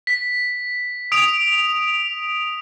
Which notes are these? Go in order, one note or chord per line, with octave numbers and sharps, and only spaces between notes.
B6
D#6 D7 F7